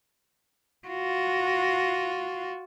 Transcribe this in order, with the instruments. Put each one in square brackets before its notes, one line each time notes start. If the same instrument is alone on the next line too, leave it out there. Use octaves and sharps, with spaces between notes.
[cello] F4 F#4